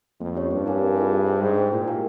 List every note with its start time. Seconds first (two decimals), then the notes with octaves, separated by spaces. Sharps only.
0.20 F2 A#3
0.35 C#4 G4 C#5
0.51 G2 C4
0.66 E4 A#4 F5 G#5
0.81 C4
0.96 F4 G#4 E5
1.11 G#4
1.26 C5 G5
1.41 G#2 G#4
1.57 C5 G5
1.72 A#2 E4
1.87 G4 A#4 F5 G#5